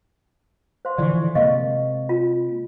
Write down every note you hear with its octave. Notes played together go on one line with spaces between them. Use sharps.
C5 F5 C6
D3 E3 F3 D5 C#6
C3 G#3 A#3 D#5 F5 C#6
F4